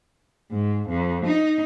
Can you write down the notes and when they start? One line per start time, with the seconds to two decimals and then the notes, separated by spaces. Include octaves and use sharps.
0.51 G#2
0.89 F2
1.25 D#4